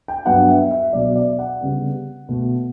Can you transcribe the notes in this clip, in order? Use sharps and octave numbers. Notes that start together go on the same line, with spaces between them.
G5
G2 F#3 B3 F#5
E5
E5
B2 F#3 B3 D5
D5
F#5
C#3 G3 B3
B2 A3